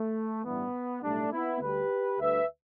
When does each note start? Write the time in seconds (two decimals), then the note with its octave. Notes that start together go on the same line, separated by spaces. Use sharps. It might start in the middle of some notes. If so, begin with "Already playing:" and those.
Already playing: A3
0.44 A1 G2 E3 G3 B3
1.02 B1 A2 G3 A3 D4
1.32 B3 E4
1.60 D2 D3 G3 G4 B4
2.18 D2 D3 G3 B4 E5